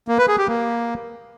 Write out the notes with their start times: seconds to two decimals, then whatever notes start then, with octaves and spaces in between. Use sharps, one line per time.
0.08 A#3
0.18 B4
0.28 G#4
0.38 G4
0.48 A#3